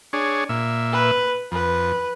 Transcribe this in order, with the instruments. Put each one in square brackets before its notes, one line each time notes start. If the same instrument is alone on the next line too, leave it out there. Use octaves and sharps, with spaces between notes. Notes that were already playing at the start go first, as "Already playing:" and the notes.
[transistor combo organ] D4 G#4 C#5
A#2 E5
[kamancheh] B4
[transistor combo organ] F2 [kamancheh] B4